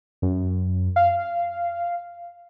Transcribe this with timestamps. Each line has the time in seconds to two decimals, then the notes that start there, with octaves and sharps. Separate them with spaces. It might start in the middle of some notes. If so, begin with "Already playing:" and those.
0.22 F#2
0.96 F5